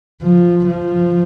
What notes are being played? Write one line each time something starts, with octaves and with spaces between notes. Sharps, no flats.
F3
F3